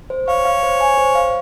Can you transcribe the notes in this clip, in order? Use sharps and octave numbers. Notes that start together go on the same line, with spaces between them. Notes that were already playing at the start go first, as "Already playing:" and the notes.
C5
C#5 F5
F5
C5
G#5
C5
F5